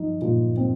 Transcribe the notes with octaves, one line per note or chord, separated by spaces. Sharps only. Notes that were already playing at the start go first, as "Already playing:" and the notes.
Already playing: F3 D#4
A#2
C4